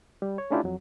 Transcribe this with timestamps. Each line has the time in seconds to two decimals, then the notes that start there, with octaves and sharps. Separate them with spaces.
0.22 G3
0.38 C#5
0.50 A3 C#4 D4 E4 F4 G4
0.64 F2 F#3